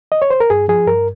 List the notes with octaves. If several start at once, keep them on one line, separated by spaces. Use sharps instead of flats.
D#5
C#5
C5
A#4
G2 G#4
F3 G#4
G2 A#4